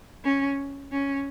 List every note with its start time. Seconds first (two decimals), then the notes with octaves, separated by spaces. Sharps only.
0.24 C#4
0.92 C#4